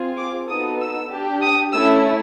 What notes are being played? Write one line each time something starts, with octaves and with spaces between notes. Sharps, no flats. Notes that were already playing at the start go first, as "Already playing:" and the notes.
Already playing: C4 F4 G#4
D6
B3 D#4 F#4 A4 D#6
E6
D4 G4
D#6
A3 C#4 E4 E6